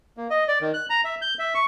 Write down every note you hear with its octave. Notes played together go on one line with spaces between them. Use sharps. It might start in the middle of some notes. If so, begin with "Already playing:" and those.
A#3
D#5
D5
D#3
F#6
A#5
E5
G6
E5
C#6